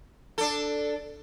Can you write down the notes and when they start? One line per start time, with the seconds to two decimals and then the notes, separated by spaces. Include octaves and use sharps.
0.38 D4 A4